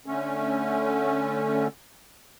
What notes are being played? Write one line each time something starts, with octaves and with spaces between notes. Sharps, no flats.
D3 A3 C#4